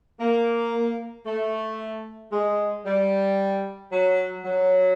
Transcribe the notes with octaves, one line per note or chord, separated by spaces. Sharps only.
A#3
A3
G#3
G3
F#3
F#3